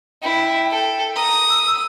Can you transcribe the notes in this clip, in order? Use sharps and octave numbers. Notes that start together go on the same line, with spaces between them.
E4 G5
A4 G5
A#5 D#6
E6